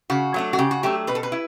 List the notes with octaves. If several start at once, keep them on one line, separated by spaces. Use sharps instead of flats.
C#3 F#4
F#3 A3 D4
F#4
C#3 G4
F#4
F#3 A3 D4 G4
B2 B4
A4
B4
E4